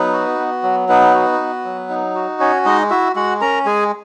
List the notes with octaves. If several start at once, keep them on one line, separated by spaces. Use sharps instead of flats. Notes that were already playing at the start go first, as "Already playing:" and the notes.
Already playing: F#3 B3 D#4 B4
F#4
B3
F#3
B3 D#4 B4
F#4
B3
F#3
D#4
F#4
C#4 C#5
G#3 D#4 D#5
E4 F#4 E5
G#3 F#4 F#5
C#4 A#4 A#5
G#3 G#4 G#5